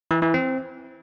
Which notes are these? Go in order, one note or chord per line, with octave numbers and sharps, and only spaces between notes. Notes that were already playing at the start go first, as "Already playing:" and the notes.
E3
E3
C4